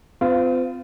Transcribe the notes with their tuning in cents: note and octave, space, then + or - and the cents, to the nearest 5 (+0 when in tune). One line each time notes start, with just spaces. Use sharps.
C4 -40 F4 -5